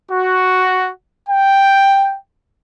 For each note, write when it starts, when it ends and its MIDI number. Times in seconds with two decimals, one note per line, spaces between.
0.12 0.90 66
1.29 2.16 79